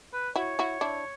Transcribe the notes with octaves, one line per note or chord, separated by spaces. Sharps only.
B4
E4 F#4 C#5
E4 F#4
D4 E4